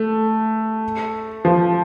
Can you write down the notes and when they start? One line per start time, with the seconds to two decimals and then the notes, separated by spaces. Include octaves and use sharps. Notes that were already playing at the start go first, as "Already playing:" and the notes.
Already playing: A3
1.45 F3